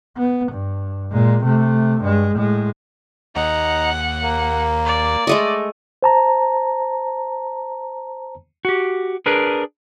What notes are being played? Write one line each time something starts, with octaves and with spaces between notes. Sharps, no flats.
B3
G2
A#2 G#3
C3 A3
G2 G#3
A2 G#3
D#2 D#4 F#5 A#5
A#3
D5
G#3 A3 D#5
C5 A5 A#5
F#4 G4
D4 G#4 A#4 B4